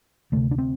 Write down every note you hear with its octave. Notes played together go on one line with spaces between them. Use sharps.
D2 C3 A3
D4
C4